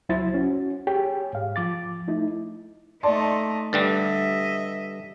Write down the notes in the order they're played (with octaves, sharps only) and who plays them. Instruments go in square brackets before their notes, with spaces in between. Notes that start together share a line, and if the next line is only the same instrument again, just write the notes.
[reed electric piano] C#2 F#3 E4 C5 A6
C#4 F#4
G4 G#4 C#5 G5
G#2 F5
F3 D6 A6
A3 D#4 E4
[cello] A3 D#4 [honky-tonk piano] D5 A5 C6
[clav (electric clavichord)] G2 D3 G3 [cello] D#5 E5 [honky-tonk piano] A6